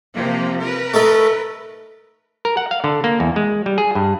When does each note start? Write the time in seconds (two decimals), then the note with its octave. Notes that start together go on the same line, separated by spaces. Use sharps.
0.14 C3 F3 A#3
0.61 A#4 B4
0.94 A3 D#4 A4
2.45 A#4
2.57 F#5
2.71 F5
2.84 D3
3.04 A#3
3.20 E2
3.36 G#3
3.66 G3
3.78 G#4
3.95 G2